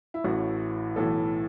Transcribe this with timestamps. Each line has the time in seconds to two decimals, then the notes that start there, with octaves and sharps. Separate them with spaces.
0.14 E4
0.24 A1 A2 E3 F#4
0.95 B1 A2 E3 A4